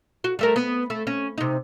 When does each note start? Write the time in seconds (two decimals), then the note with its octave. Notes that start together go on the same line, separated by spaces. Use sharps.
0.24 F#4
0.39 G3 A3 A#4
0.56 B3
0.90 A3
1.07 C#4
1.38 C3 D#4